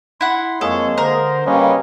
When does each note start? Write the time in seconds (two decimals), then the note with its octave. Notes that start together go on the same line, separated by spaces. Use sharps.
0.21 E4 F#5 C6
0.61 F2 G#3 A#3 G#4 A4 C#5
0.98 D3 A#4 C5
1.46 C#3 G3 A#3 C#4 B4 D#5